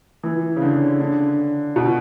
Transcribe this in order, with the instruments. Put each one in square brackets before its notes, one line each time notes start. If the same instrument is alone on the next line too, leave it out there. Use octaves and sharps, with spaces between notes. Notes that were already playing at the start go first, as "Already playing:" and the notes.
[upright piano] E3
C#3
D3
D3
B2